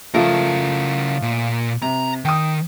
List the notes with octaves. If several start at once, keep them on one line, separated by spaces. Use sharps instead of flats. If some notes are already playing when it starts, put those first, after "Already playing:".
C#3 F3 A3 F4 A#4
A#2
C3 A#5
D#3 G5 D#6